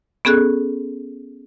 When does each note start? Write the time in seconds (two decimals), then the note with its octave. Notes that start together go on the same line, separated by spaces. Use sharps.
0.25 B3 C#4 G#4 A4 F#6